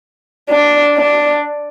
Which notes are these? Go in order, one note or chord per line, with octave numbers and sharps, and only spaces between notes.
D4
D4